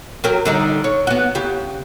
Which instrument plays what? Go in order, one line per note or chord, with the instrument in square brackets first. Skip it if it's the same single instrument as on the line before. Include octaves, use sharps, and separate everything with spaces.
[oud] F#3 G4 A#4
D3 G3 D#4
C#5
B3 F#4
C#3 G4